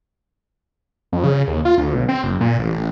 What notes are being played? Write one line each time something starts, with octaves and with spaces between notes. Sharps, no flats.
F2
C#3
D#2
F4
D2
B1
C4
F#1
A#2
A1
A1